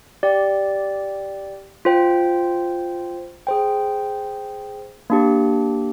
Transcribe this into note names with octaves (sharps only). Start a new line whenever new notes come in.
G4 D5 G5
F4 C5 G5
G#4 C5 G5
A#3 D4 G4